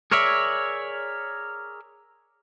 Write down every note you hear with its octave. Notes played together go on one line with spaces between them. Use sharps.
G#4 A#4 C#5 D5 E5